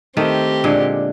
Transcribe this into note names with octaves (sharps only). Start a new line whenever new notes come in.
D#3 A3 C4 G4
A#2 D3 G#3